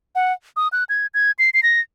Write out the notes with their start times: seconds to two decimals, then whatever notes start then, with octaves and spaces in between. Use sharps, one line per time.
0.15 F#5
0.56 D#6
0.72 F#6
0.89 G#6
1.14 G#6
1.39 C7
1.54 C7
1.63 A#6